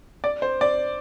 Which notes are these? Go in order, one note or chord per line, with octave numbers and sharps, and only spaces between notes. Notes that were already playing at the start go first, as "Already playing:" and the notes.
D5
C5
D5